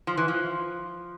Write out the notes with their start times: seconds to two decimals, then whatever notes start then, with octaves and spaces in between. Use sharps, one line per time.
0.07 F3
0.17 E3
0.28 F3